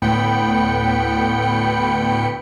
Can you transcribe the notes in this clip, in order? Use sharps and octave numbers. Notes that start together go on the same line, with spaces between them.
D2 A2 B3 G5 B5 C#7